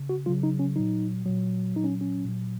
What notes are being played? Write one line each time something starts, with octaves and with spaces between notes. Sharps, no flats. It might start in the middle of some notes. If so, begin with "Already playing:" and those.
Already playing: C#3
F#4
C#3 F#3 F4
D#4
C#4
A#2 F#3 D#4
A#2 F#3
A#2 F#3 D#4
C#4
C#4
A#2 F#3